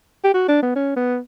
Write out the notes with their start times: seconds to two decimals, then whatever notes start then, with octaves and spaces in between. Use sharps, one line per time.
0.24 G4
0.34 F#4
0.48 D4
0.62 B3
0.76 C#4
0.96 B3